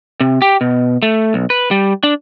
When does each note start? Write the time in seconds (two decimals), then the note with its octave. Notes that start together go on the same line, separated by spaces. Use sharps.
0.21 C3
0.42 G4
0.61 B2
1.02 A3
1.34 B1
1.50 B4
1.71 G3
2.03 D4